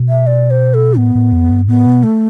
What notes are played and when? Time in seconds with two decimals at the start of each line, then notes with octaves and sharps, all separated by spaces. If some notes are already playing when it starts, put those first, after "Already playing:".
Already playing: B2
0.09 E5
0.27 D5
0.50 C5
0.74 A4
0.97 A2 B3
1.15 A2
1.33 F2
1.51 G2
1.68 A2 B3
1.86 B2
2.03 A3